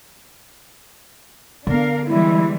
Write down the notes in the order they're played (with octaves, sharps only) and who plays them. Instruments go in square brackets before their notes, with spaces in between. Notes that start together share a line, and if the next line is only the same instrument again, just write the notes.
[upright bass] D3 B3 [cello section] D4 A#4 F5
[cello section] E3 G3 G#3 [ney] E4